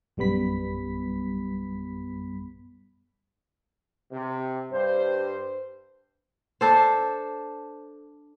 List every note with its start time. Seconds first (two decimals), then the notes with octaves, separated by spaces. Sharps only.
0.17 A#1 F#2 G3 B3 B5 B6
4.12 C3
4.72 G2 C5
6.61 D4 A4 C5